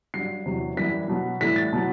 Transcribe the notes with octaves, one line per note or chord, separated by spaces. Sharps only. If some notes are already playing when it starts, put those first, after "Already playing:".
G2 F#3 C7
E2 C3 F#3
F#2 E3 G3 B6
B2 F#3
A2 E3 G3 B6
A6
B2 F#3